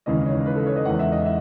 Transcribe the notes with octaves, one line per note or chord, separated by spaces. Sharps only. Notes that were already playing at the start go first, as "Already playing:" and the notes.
D#2 C#3 E3 G#3 D#5
C#5
B4
A4
C#5
D#5
E2 D#3 G#3 F#5
E5
D#5
E5